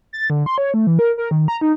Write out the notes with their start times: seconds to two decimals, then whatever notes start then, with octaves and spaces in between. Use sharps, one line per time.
0.13 A6
0.30 D3
0.46 C6
0.58 C#5
0.74 A3
0.87 E3
0.99 A#4
1.18 A#4
1.31 D#3
1.48 A#5
1.61 D#4